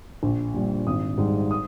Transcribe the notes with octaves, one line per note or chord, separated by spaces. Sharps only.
A#1
A#2 G3
G#1 D#6
G#2 G3
D#6